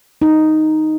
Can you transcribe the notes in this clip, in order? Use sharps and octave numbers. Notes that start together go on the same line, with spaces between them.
D#4